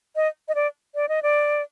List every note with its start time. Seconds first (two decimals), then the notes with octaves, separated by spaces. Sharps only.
0.16 D#5
0.48 D#5
0.55 D5
0.95 D5
1.09 D#5
1.23 D5